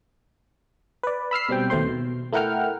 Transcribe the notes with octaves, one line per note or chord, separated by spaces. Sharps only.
B4 D5
B5 E6 F6 C7
B2 G3 C4 G5
D#2 B2 A3 C5 C6
B2
A3 E4 A#4 F#5 G5 F6